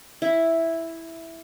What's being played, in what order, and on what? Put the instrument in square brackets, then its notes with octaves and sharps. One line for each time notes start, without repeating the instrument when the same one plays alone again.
[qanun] E4